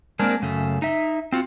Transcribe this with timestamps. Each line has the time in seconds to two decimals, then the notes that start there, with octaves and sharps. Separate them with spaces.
0.19 G#3 A#3 C4 D4 A#4
0.42 F#2 C#3 A3
0.82 D#4 E5
1.32 C4 F4 F#4